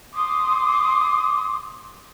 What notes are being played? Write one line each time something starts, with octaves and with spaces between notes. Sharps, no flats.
C6 D6 D#6